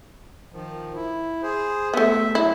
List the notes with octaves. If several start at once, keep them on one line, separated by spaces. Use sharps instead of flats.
D#3 F3
E4
G#4 C5
A3 B3 E5
F#3 E4